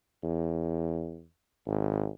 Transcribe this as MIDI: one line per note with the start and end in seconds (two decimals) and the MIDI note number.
0.23 1.24 40
1.67 2.08 32